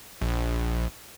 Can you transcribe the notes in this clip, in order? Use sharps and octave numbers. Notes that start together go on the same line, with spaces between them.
A#1